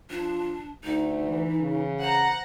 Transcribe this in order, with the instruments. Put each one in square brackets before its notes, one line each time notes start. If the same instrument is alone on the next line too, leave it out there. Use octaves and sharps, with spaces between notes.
[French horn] F3 [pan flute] D4
[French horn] D2 [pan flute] D#4
[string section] E3
[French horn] C#3
[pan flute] C5 [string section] F#5 A#5